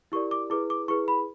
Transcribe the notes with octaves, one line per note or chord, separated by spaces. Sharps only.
E4 G4 A#4 D5 C#6
D6
E4 G#4 B4 D6
D6
E4 G#4 B4 C#6
B5